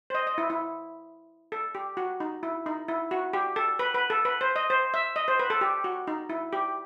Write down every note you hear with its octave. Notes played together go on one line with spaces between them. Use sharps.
C5
D#5
D#5
E4
E4
A4
G4
F#4
D#4
E4
D#4
E4
F#4
G4
A4
B4
B4
A4
B4
C5
D#5
C5
E5
D#5
C5
B4
A4
G4
F#4
D#4
E4
G4